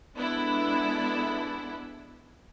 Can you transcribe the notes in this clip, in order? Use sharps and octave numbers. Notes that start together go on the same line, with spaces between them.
G#3 B3 D4 E4 A4